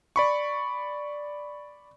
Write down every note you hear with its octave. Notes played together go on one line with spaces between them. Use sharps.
D5 B5 C#6